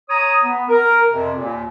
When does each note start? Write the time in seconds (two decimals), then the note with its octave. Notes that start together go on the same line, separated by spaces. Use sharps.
0.09 C#5 A#5 D#6
0.43 B3
0.68 A#4
1.10 F2 C3
1.37 D#2 A#2